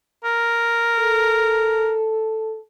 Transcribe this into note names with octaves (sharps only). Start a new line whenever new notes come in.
A#4
A4